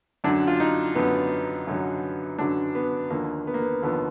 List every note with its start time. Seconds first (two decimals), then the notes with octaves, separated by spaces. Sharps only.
0.24 F#2 D3 F#3 D4
0.47 F4
0.60 D#4
0.95 F#2 D3 F#3 B3
1.67 F#2 D3 F#3
2.38 F#2 D3 F#3 D4
2.75 B3
3.10 D#2 D3 F3 A#3
3.47 B3
3.54 A#3
3.62 B3
3.82 D#2 D3 F3 B3